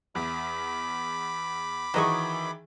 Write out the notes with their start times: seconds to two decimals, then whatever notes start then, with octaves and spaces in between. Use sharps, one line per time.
0.15 E2 B5 D6
1.94 D#3 E3 F#3 G#4 D#5 C#6